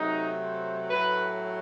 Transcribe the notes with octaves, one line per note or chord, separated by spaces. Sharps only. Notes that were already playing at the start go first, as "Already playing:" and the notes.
Already playing: C3 F#3 A3 D#4
C5
A2 F#3 A3 B4